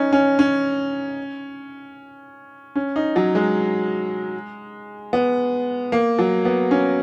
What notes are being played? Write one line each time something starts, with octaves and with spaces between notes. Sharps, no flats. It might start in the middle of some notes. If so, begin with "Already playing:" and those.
Already playing: C#4 D#4
C#4
C#4
C#4
D#4
F#3
G#3
B3
A#3
F#3
B3
C#4